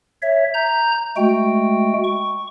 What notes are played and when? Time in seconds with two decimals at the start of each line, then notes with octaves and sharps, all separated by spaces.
0.22 C#5 E5
0.54 A#5 G6
1.16 G#3 A3 F#4 G5
2.04 C#6